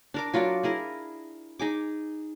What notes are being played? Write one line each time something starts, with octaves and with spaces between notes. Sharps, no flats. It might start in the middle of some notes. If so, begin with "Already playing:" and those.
D4 A#4 D6
F#3 F4 A#4 D5
E4 G#4 A#4
D#4 G#4 D6